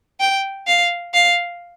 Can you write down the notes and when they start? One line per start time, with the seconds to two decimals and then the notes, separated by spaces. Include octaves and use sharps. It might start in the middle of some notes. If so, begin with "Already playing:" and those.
0.20 G5
0.67 F5
1.14 F5